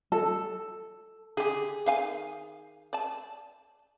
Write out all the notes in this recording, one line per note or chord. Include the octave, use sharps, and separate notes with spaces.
A4
D3 G4 G#4
D#3 F5 G#5
D5 A5